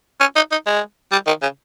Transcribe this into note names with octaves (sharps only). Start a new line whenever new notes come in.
C#4
D#4
D#4
G#3
G3
D#3
C#3